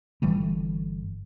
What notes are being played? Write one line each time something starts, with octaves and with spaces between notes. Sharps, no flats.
G1 E3 G3 A3